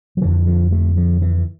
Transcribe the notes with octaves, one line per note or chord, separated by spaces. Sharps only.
F3
F2 D3 E3
F3
A3
F3
E3